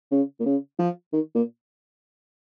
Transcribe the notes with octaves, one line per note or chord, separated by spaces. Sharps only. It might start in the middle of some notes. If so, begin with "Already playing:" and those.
C#3
A#2
C#3
F3
D#3
A#2